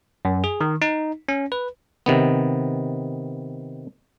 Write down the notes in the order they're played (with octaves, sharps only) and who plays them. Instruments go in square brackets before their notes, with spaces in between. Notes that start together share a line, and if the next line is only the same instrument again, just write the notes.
[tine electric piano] F#2
G#4
D#3
D#4
C#4
B4
[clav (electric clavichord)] C3 D#3 B3